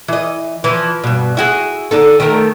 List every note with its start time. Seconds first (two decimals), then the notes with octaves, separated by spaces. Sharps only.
0.08 E3 D#5
0.64 E3 F3
1.04 G2 B2
1.37 E4 F#4 G#4
1.91 D3 D#4 A4
2.20 D#3 A3 A#4